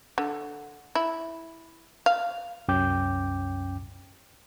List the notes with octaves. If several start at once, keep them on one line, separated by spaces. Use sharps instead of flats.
D3
E4
F5
C2 F#2 C#4 G5 D6 G6